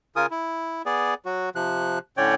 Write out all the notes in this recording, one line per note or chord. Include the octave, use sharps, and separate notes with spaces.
C#3 F4 A#4 G#5 D#6
E4
B3 G#4 D5
F#3 F#4
C3 F3 F#6
A2 D3 C#4 C#5 D5 G5